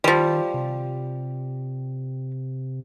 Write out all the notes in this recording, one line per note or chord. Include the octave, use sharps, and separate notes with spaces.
D#3 F3 G3
C3